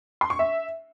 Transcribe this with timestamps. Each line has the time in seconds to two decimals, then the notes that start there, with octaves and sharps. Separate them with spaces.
0.21 C6
0.30 C#6
0.39 E5